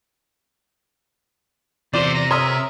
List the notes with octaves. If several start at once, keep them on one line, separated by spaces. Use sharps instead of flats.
E2 C3 F4 C5 D5
A#5
C#5 E5 A#5 C6 D#6 F6